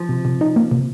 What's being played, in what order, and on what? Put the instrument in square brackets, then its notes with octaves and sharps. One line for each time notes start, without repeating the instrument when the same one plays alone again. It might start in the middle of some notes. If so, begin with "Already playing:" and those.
Already playing: [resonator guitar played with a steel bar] F3
[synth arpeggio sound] C3
C3
D#4
A#3
C3